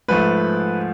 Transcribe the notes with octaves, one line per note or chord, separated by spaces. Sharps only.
G#2 F3 A3 B4